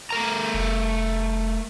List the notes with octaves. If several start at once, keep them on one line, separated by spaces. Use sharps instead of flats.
A3 A#4 A#5
F1